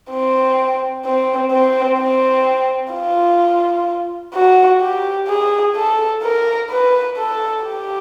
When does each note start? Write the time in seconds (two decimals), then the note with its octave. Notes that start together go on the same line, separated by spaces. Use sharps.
0.11 C4
1.05 C4
1.52 C4
2.00 C4
2.94 F4
4.35 F#4
4.82 G4
5.29 G#4
5.76 A4
6.23 A#4
6.70 B4
7.18 A4
7.65 G4